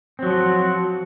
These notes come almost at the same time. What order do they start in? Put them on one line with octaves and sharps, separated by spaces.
C4 F#3 F3 F#4